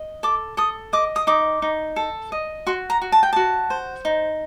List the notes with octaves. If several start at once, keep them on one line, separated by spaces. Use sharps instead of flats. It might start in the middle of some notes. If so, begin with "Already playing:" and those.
Already playing: D#5
A4 D6
A4 D#6
D#5 D6
D#6
D#4 D6
D#4
A4
D#5
F#4 C6
A#5
F#4
A5
G5
F#4 A5
C5
D#4